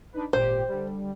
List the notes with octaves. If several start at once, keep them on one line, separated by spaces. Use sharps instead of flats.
D4 D#4 B4
G#1 A#2 G4 C5
D3 G3